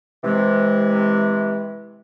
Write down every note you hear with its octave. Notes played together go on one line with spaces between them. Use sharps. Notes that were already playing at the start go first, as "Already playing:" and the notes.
C3 E3 G#3